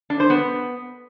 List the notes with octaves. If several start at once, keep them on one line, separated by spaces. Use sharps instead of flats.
D4
C5
B3